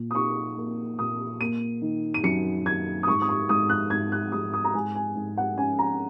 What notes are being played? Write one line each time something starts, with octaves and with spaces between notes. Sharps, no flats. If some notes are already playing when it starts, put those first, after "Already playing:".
Already playing: A#2
D#6
D#4 C#6
A#3
A#2 D#6
A#3 D#7
D#3
D#7
F#2 C#7
D#3 G#6
D#6
G#2 C#6
D#6
C#6
G#2 D#6
F#6
G#2 G#6
F#6
G#2 D#6
D#6
A#5
G#2 G#5
G#5
G#2
F#5
C#4 G#5
A#5